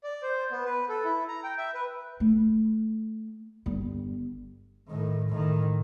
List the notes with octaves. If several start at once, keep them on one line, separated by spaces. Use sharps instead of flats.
D5
C5
B3
B4
A4
E4
A#5
G5
E5
B4
A3
G1 G3
A2 D#3
A2 D#3